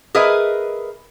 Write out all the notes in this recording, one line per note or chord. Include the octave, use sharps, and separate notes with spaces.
G#4 A#4 B4 D#5 E5